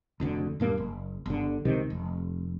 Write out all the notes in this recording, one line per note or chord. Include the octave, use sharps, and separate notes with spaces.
F1 D2 D3
D#1 G2 A#3
F#1
G1 D3
C#2 C3 D#3
F1